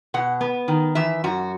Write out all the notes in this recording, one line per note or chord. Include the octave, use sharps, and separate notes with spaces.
B2 F#5
B3
D#3
E3 E5
F#2 F#4